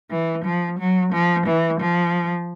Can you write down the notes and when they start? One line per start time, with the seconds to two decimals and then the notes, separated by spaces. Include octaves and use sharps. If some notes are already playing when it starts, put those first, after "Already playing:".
0.11 E3
0.45 F3
0.79 F#3
1.13 F3
1.46 E3
1.80 F3